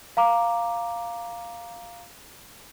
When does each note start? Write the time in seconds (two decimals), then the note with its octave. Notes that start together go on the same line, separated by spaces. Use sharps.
0.17 F5 A#5 D6